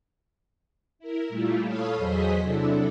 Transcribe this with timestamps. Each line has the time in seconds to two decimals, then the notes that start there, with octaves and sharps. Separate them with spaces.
0.99 E4 A#4
1.29 A#2 G3 A3 E4 F4
1.64 A4 C#5 F5 B5 D#6
1.96 E2 F#3 G#4 C5 D#5 B6
2.42 C3 F#3 D4 E4 A4